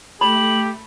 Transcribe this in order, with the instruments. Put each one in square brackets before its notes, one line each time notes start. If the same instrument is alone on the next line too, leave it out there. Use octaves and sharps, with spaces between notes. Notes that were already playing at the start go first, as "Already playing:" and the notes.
[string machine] A3 [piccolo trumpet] G4 [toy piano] B5 [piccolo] F#7